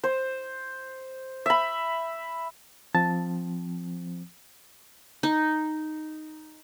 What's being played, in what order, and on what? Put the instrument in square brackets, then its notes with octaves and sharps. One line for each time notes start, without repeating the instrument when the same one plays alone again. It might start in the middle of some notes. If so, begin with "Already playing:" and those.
[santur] C5
E5 B5
[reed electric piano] F3 C4 [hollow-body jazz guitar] A5
[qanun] D#4